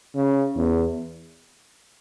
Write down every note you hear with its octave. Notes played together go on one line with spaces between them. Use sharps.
C#3
E2